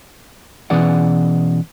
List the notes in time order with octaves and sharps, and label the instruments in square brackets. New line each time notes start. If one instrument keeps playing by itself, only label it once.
[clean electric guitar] B2 E3 C#4 G#4 D5 F#5